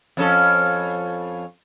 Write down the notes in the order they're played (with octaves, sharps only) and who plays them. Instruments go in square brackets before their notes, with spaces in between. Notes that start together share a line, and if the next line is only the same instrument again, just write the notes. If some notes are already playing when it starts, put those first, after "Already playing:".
[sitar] F2 C#4 A4